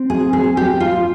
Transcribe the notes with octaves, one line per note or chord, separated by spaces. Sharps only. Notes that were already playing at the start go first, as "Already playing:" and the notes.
Already playing: C4
G#4
G#4
G4
F4